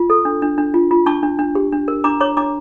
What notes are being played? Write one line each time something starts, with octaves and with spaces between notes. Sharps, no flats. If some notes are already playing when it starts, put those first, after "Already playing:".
Already playing: F4
A4
D4
D4
D4
F4
F4
D4 A5 C#6
D4
D4
G4
D4
A#4
D4 A#5 D6
C#5 A#5 D6
D4 A#5 D6